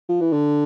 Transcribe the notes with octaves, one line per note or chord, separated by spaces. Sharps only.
F3
E3
D3